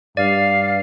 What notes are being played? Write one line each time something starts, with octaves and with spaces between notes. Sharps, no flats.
G2 D5 F5